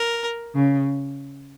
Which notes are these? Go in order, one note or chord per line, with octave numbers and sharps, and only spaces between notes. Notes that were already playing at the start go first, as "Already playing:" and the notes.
Already playing: A#4
C#3